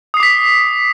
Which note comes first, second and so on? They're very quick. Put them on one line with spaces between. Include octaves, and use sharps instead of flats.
D#6 C7 D6 B6